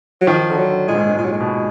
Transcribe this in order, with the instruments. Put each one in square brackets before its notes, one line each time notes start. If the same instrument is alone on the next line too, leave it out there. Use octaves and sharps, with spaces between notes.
[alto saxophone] F#3
[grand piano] D#3 [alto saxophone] F3
[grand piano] D3
[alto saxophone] F#3
[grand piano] D3
[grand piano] A#2 [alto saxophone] G#3
[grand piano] G#2
G#2
[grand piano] A#2 [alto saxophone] G#3
[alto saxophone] F#3
G#3
[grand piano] B2